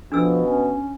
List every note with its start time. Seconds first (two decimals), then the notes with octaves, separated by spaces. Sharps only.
0.12 B2 F3 D4 A4 E6
0.44 C#4